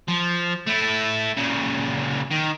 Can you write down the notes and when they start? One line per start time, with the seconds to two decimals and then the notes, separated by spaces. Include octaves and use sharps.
0.08 F3
0.67 A3 E4
1.37 A#2 C#3
2.31 D#3